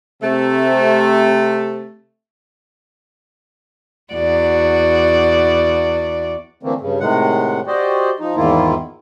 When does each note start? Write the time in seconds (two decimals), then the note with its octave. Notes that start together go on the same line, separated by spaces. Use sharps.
0.22 C3 A3
4.14 E2 F#4 D5
6.63 D3 E3 A3 A#3 C4
6.80 G2 C#3
7.00 A2 C3 D#3 G#3 F#5
7.67 F#4 G4 C5 D5 D#5
8.20 F3 D#4
8.36 E2 G#2 D#3 A#3 E4 F4